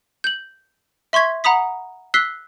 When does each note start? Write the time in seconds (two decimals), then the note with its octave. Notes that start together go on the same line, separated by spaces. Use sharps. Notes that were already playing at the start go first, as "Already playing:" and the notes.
0.24 G6 F#7
1.13 E5 C6 C#6 G#6 B6
1.44 F#5 A#5 B5 D#6 B6
2.14 E6 F#6 B6 C7 G7